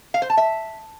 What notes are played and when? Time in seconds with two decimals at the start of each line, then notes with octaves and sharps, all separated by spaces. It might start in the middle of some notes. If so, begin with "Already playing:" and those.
0.14 F5
0.22 C5
0.30 A5
0.37 E5